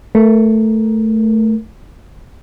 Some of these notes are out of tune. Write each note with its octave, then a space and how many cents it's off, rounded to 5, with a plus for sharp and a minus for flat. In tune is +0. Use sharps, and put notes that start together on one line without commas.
A3 +0 A#4 +15